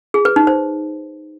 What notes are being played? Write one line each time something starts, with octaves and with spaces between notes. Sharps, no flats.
G#4
B4
D#4
C5